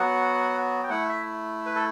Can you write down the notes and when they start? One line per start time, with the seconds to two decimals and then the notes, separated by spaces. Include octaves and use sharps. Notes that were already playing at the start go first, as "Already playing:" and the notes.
Already playing: F#3 B3 F#4 F#5
0.83 G5
0.90 A3 E4 F#5
1.09 E5
1.66 B4
1.75 A4